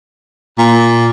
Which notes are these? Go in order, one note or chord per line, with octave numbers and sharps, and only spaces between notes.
A#2